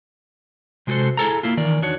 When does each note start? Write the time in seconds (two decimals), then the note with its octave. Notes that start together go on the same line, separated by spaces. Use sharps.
0.87 C3 G#3 F#4 G4 A4 C5
1.17 E4 G#4 A4 A#5
1.43 A#3 E4 F4
1.57 D#3 E3 A#4 D5
1.82 E2 D4 D#4 F#4 C#5